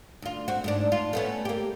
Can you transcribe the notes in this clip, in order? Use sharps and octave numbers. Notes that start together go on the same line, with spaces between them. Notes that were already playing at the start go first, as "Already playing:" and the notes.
D2 F4
C4 F#4
G#2 A3 D4
F4
A3 B3 C#4
A#3 G4